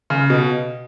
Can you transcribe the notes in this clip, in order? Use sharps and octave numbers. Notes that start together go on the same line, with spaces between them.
C#3
B2